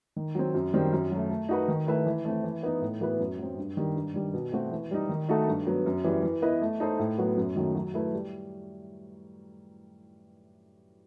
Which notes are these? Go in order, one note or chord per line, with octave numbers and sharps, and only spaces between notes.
D#3
F#3 C4
F#2
D#3 G3 C4
F#2
F#3 A3
A3
D#4 F#4 B4
D#3
A3 E4 B4 E5
E3
A3 C4
E3
B3 D#4
A2
E3 B3 F#4 B4
F#2
F#3 C4
G2
D#3 G3
G2
D#3 G3
B2
A3 C4 F#4
E3
G3 D#4
D#3
A3 D#4 F#4 A4
G2
F#3 B3
F#2
E3 G3
E3
B3 E4 B4 D#5
A3
D#4 A4 C5
A2
F#3 B3 F#4
F#2
D#3 F#3 A3
F#3
A3 E4 B4 E5
G3